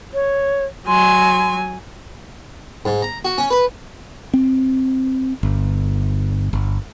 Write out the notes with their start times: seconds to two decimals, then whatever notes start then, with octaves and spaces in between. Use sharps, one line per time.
0.14 C#5
0.87 F#3 G#5 C6
2.85 G#2
3.02 A#5
3.25 F#4
3.38 C#4
3.50 B4
4.34 C4
5.43 G1
6.53 G1